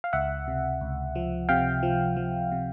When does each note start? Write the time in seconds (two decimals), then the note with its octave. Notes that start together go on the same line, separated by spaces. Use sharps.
0.04 F5
0.13 C#2 E5 F#5
0.48 C3
0.81 C#2
1.16 F3
1.49 C3 F5 G5
1.83 F3
2.17 F3
2.52 C3